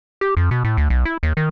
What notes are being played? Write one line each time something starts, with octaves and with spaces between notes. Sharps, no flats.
G4
F2
B2
A2
D2
B1
E4
D#2
D#3